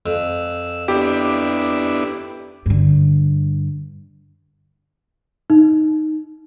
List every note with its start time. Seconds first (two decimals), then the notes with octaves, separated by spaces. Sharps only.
0.06 F2 E6
0.88 B3 D4 E4 G4
2.66 G2 D3
5.50 D#4